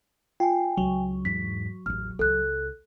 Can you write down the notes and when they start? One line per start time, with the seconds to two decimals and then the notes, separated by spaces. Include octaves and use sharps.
0.40 F4 G5 G#5
0.77 C#2 F#3
1.25 E2 G#2 B6
1.86 A1 E2 F6
2.19 C#2 A4 F#6